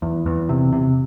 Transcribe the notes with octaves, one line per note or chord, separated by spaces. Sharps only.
E2
E2
C3
C3